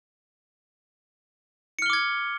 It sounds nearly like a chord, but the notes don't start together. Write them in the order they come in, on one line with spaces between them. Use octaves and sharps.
C#7 F6 G7 D6 G#6